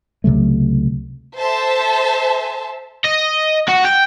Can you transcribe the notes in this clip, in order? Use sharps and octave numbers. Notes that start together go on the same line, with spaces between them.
C#2 C3 F#3 A3
A4 C5 E5 A5
D#5
F#4
G5